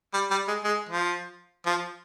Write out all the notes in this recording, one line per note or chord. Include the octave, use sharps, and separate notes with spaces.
G3
G3
G#3
G#3
F3
F3